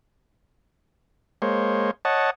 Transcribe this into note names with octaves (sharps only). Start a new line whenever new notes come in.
G#3 A#3 C5 C#5
C#5 D#5 F#5 A5